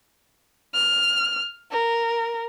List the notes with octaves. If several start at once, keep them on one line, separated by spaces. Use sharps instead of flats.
F6
A#4